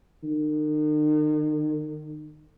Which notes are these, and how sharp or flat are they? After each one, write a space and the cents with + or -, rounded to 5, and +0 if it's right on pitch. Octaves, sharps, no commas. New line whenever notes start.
D#3 -40